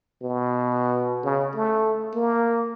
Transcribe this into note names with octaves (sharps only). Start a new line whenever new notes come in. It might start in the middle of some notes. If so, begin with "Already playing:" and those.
B2
C#3
A3
A#3